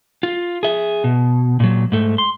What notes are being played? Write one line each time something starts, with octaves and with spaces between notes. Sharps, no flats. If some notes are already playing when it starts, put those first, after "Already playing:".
F4
G#4 E5
B2
A#2 F#3
G#2 A3
C6